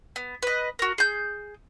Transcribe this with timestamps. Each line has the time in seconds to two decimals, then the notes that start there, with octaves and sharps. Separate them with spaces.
0.16 B3
0.43 B4 D#5
0.79 F#4 A#4
0.98 G#4 G6